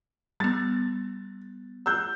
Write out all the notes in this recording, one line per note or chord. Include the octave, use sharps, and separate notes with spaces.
G3 B3 A6
E6 F#6 G6